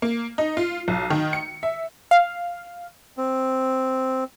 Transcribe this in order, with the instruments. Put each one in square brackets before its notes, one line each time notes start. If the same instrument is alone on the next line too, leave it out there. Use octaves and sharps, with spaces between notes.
[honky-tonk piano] A#3
D#4
F4
B1
D#3
C#7
E5
[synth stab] F5
[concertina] C4